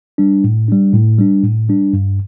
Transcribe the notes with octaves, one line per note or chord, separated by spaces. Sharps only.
G3 D4
A2
G3 D4
A2
G3 D4
A2
G3 D4
G2